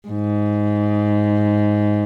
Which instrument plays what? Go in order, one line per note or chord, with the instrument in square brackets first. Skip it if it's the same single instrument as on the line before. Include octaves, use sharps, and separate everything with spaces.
[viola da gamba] G#2